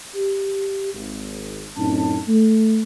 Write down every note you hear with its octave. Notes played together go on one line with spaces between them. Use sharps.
G4
G#1
F#2 A2 C4 C#4 D#4 A5
A3